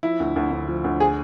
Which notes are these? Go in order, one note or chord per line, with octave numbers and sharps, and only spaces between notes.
F3 E4
D2
D2
D2
F3
D2
G#4